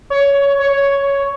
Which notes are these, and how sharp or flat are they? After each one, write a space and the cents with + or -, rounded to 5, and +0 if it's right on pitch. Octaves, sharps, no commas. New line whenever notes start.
C#5 +15
C#5 +5